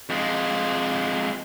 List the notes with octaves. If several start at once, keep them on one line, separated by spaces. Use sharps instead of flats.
F2 G#3